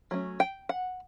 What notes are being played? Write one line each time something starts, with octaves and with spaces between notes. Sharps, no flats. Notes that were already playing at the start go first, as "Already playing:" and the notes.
F#3 A3 C#4
G5
F#5